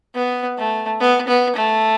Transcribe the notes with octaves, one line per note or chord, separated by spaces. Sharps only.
B3
A3
B3
B3
A3